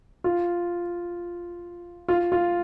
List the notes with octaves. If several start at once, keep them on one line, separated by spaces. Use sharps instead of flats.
F4
F4
F4